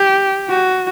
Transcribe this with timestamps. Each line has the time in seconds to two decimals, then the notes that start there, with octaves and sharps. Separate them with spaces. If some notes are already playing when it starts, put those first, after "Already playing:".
Already playing: G4
0.49 F#4